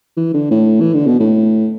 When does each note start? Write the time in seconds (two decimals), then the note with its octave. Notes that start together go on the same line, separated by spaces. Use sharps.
0.17 E3
0.34 D3
0.51 A2
0.81 E3
0.94 D3
1.07 B2
1.20 A2